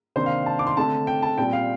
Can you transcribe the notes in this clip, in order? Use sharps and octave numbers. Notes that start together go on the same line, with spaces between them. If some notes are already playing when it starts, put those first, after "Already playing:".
C3 D#3 A#3 D4 C5
F5
A5
D6
C6
D3 A3 C4 A5
G5
A5
A#2 G3 C4 G5
F5